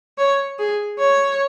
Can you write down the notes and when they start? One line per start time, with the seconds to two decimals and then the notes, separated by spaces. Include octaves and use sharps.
0.18 C#5
0.59 G#4
0.99 C#5